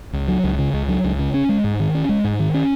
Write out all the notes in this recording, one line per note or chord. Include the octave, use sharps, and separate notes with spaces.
C#2
F#3
C#2
C#3
C#2
F#3
C#2
C#3
C#4
G#3
G#2
D#3
C#4
G#3
G#2
D#3
C#4